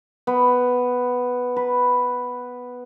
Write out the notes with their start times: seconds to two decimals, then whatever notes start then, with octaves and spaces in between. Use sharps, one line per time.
0.27 B3
1.56 B4